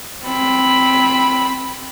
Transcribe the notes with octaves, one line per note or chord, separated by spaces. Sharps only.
C4 B5